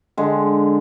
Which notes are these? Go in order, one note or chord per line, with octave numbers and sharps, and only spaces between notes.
D3 G#3